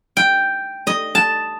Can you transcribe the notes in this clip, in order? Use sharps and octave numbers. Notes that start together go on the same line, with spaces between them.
G5
D#5
A5